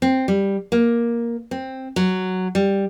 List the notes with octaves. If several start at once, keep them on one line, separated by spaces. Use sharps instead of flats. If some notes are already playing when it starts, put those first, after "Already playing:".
C4
G3
A#3
C4
F#3
G3